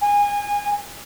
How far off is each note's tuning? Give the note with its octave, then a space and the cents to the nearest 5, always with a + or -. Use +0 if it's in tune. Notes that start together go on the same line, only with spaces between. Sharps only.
G#5 -25